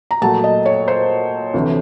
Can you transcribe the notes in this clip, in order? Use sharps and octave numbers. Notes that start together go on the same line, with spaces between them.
A#5
A#2 F#3 A3 A5
D#5
C#5
C5
D2 C3 E3 A3